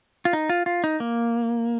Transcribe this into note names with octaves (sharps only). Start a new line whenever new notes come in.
F4
D#4
F4
F4
D#4
A#3